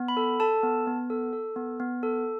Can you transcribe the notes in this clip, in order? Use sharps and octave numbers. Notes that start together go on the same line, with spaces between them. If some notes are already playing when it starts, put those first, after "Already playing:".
Already playing: B3
B5
A4
A4 A5
B3
B3
A4
A4
B3
B3
A4